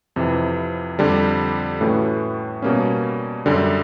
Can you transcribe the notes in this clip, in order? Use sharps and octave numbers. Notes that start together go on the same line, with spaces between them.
F2 C3 E3
F2 D3 G3
A2 E3 A3 C#4 F#4
B2 G3 A#3 C#4
F#2 D3 G3